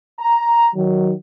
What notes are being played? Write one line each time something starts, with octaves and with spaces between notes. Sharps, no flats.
A#5
D#3 F#3